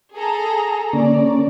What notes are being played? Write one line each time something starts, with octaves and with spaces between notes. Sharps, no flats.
G#4 A4 A#5
D3 A#3 C#4 D5